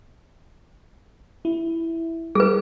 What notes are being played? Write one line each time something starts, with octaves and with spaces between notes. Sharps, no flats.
E4
G3 G#4 B4